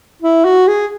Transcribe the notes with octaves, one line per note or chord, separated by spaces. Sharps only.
E4
F#4
G#4